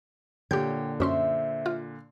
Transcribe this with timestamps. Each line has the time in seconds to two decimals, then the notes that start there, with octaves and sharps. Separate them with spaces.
0.51 A#2 D3 G4 C#5 G5 G6
1.00 F#2 C#4 C5 E5 C6
1.66 F4